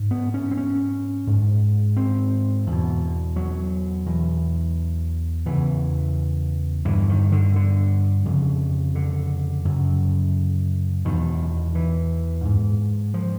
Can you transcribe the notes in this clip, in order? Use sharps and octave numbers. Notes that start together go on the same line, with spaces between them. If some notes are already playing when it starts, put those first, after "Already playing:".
Already playing: G#2
B3
C#4
C4
C#4
G#2
C4
E2 B2
F#3
E2 B2
E2 C#3 E3
G2 D3 E3
D#3
D3
D3
F2 C#3
D3
F#2 C#3
E2 B2 D#3
E3
G#2
F3